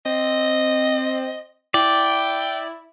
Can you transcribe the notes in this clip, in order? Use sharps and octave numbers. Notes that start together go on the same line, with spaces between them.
C4 D#5
E4 D5 G5